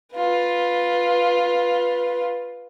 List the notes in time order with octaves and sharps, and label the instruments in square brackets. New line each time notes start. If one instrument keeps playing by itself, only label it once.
[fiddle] F4 B4